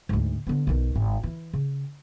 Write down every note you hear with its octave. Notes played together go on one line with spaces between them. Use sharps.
D2 G#2
D3 B3
B1 D#3
G#1
E3 E4
C#3